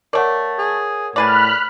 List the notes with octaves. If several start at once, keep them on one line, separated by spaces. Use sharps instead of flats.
A3 A#4 C#5 D5 F#5
G#4
A2 G#4 B4 D5 B5 F6 F#6